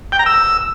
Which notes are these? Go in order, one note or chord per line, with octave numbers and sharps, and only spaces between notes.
G5
A#5
E6